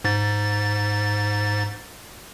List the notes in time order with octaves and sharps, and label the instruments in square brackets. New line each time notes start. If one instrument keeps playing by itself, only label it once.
[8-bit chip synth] G#2 A6